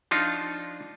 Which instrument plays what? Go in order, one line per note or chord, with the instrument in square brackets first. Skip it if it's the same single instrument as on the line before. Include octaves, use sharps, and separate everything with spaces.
[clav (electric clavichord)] F3 D4 D#4 F4